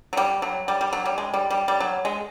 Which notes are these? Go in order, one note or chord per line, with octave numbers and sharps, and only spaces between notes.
F#3
G3
F#3
G3
G3
F#3
G3
G#3
G3
G3
G3
F#3
G#3